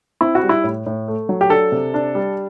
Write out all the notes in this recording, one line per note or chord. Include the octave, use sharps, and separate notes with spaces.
C4 E4
F#4
G3
E4
A2
A2
A3
F#3
G4
D4 A4
C3
D4
G3